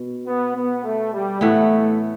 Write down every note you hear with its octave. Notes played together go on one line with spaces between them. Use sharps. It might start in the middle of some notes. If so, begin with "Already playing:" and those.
Already playing: B2
B3
B3
A3
G3
A2 E3 A3 B3